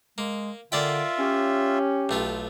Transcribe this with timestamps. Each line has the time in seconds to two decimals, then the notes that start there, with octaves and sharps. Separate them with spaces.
0.18 G#3 A#3
0.72 D3 A#3 F4 D5 E5 G5
1.18 C#4 G4
2.09 B1 A3 F4